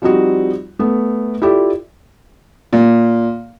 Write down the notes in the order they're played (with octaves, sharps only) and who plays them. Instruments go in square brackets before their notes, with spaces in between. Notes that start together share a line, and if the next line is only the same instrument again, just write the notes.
[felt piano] F3 G3 C4 D#4 F#4
A3 B3
E4 F4 G4 A4 D5
[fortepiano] A#2